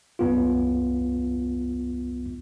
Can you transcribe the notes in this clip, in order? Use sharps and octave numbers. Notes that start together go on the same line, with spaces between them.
C2 F#2 B3 F4